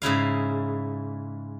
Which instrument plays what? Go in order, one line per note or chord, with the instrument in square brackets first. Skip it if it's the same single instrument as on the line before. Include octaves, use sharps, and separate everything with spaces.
[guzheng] G#2 C#3 E4 F5